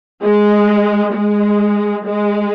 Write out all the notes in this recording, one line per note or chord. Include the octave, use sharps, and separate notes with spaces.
G#3
G#3
G#3